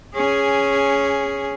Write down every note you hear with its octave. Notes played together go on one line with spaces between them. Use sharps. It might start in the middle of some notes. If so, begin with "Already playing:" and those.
C#4 G#4